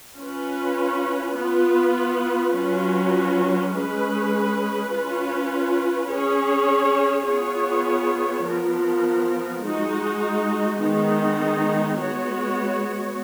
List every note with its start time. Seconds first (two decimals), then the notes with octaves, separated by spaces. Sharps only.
0.18 C#4 F4 B4
1.37 B3 F4 B4
2.55 F#3 C#4 F4 B4
3.73 G#3 C#4 G#4 B4
4.91 C#4 F4 B4
6.08 C#4 G#4 C#5
7.26 B3 F4 G#4 C#5
8.44 F3 B3 F4 A#4
9.62 G#3 D#4 F#4
10.80 D#3 G#3 B3 D#4
11.98 G#3 B3 F#4 C#5